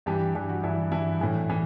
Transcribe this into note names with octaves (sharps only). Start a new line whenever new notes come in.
G2 E3 G4
G2 E3 G4
F#4
G2 E3 E4
G2 E3 E4
A2 E3
E3